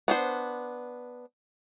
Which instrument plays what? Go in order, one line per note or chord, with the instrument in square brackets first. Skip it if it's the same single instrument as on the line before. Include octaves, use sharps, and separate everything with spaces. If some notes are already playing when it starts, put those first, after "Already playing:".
[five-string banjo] B3 D4 C5